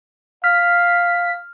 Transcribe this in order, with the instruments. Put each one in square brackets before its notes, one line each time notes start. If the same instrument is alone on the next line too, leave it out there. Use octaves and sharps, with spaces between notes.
[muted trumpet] F5 [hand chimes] F6 [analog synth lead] B6